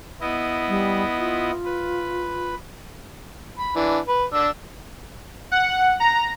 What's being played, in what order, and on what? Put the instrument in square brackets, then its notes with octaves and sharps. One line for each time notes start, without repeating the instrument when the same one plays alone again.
[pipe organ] B3 E4 D#5
[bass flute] G3
F4
[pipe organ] B4
[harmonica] B5
E3 D4
B4
D4 E6
[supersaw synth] F#5
A#5